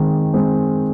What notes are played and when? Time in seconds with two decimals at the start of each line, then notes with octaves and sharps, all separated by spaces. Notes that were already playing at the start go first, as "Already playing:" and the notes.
Already playing: D#3 G#3 C4
0.34 G#3 C4